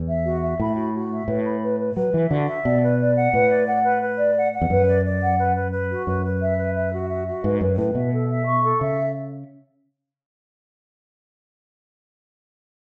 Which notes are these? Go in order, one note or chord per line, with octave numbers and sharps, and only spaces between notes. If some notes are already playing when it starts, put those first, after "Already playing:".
Already playing: E2
E5
F#4
E5
A2 B5
F#4
F#4
E5
A2 B4
B5
B4
B4
F#3 B4
E3 E5
D3 F#4
E5
B2 D5
B4
D5
F#5
A2 B4
D5
F#5
B4
B4
D5
F#5
F#5
E2
F#2 B4
D5
D5
F#5
B4
B4
B4
F#4
F#2 B4
B4
E5
B4
E5
F#4
E5
F#4
G#2 B4
F#2 B4
A2 B4
B2 E5
A4
E5
C#6
A4
C#3 E5